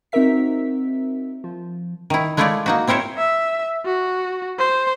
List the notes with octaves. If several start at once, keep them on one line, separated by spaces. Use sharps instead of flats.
C4 D#4 F#4 A#4 E5 B6
F3
D#3 E4
G#3 A3 E4 F4 C#5 D5
A#3 D#4 F#4
C4 E4 A#4 C5 C#5
E5
F#4
C5